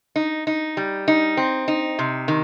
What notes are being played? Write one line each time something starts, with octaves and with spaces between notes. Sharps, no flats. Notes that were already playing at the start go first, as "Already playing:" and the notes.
D#4
D#4
G3
D#4
C4
D#4
C3
D#3